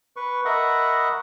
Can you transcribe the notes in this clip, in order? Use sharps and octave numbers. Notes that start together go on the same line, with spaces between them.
B4 C#6
A#4 D#5 E5 F#5 B5 C#6